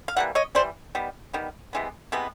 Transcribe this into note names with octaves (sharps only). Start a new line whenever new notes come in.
F5
E3 G3 A#3 F#5
C#5 D#5
E3 G3 C5 D5
D#3 G3 B3
D#3 G3 B3
C3 E3 G#3 B3
C3 E3 G#3 B3